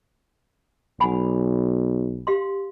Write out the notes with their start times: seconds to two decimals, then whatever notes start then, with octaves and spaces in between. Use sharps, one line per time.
1.00 B1 F#5 G#5 B5
2.27 G4 F5 C6